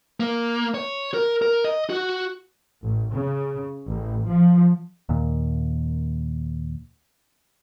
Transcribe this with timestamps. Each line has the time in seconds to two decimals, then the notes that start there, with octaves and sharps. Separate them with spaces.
0.20 A#3
0.74 C#5
1.14 A#4
1.42 A#4
1.64 D#5
1.90 F#4
2.83 A1
3.13 C#3
3.86 A1
4.28 F3
5.09 D#2 A#2